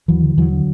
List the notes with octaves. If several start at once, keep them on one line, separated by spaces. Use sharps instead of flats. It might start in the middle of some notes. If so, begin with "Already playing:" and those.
D#2 E3 F#3
D3
D#2 E3 F#3
D3